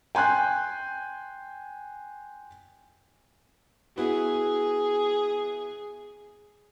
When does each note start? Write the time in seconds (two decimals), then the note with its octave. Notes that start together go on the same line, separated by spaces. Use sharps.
0.15 G5 G#5 C6 F#6 G6
3.97 B3 E4 F#4 G#4